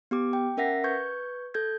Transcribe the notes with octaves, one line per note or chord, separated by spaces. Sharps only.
B3 G4 D6
G5
C#4 A#4 E5 F#5 A#6 B6
B4 C#6 G6 G#6
A4 G6 G#6